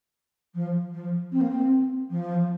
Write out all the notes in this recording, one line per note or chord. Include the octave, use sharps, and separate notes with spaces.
F3
F3
C4
A#3
C4
F3